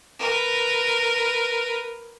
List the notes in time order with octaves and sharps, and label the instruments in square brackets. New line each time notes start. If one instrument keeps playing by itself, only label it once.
[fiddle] A#4 B4